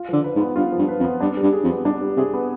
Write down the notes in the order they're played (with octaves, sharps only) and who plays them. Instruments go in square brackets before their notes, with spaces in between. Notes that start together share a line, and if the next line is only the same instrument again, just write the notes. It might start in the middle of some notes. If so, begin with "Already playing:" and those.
Already playing: [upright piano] F4
[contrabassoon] D3 [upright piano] F3
[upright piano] B4
[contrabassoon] G#2
[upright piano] B3
[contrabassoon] G2 [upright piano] F4
[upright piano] F3
[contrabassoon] G2
[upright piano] B4
[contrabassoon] F2
[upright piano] B3
[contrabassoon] G2 [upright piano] D4
[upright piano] G3
[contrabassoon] G2
[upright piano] G#4
[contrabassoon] F2
[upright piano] B3
[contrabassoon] G2 [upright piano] D4
[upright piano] G3
[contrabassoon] C3 [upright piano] G#4
[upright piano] B3